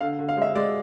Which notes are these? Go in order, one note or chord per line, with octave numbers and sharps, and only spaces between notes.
D3 F5
D3
F5
G#3 E5
G#3 D5